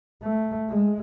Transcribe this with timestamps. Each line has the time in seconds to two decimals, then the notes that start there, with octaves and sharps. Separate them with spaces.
0.23 A3
0.70 G#3